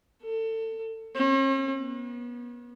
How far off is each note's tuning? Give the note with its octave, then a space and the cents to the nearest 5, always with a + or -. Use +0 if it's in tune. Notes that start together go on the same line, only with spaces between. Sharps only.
A4 +30
C#4 -45
B3 -35